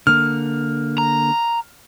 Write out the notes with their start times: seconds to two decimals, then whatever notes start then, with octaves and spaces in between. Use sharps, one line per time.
0.07 D3 A#3 F6
0.98 A#5